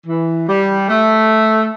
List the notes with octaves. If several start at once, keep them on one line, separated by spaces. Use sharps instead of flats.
E3
G3
A3